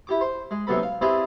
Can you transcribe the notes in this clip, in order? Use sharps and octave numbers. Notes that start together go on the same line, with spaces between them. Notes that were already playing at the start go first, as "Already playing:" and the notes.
E4 G4 D6
C5 C6
G#3
D#2 C3 F#3 B3 A4 B5
F5
C4 E4 G4 G#4 B4 D5